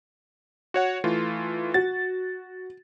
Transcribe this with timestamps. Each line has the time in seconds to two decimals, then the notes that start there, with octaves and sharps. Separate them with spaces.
0.74 F#4 C#5 F#5
1.04 E3 A3 F4
1.74 F#4 A6